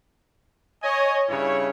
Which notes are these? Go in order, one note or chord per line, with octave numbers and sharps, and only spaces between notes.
C#5 D#5 G#5
G2 C#3 E4 C#5